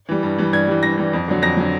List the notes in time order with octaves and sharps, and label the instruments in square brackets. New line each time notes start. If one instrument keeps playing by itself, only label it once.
[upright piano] E3 G3
G2
E3 G3
G2 G#6
E3 G3
G2 A#6
E3 G3
F2
D3 F#3
F2 A#6
D3 F#3